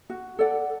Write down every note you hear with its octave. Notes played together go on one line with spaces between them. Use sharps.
F#4
A4 D5 F#5